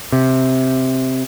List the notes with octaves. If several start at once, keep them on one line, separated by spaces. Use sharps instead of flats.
C3